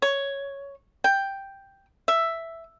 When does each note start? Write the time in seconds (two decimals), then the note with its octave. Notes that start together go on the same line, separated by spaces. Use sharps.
0.02 C#5
1.04 G5
2.08 E5